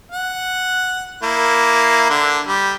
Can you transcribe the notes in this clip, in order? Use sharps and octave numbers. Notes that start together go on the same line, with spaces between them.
F#5
A#3 E4
D3 D4
G3